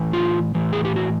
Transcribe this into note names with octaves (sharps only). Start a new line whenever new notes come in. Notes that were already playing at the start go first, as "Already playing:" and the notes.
Already playing: A2 E3
F4
A2 E3
G#4
G4
F#4